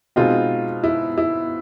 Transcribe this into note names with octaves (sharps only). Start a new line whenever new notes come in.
B2 G#3 C4 D#4 F4
E4
E4